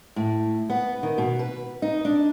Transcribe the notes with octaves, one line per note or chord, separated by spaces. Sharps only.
A2
B3
D#3
B2
B4
D#4
D4